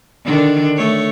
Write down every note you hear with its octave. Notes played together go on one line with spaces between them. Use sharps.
D3 D#3 D4
A3 C#5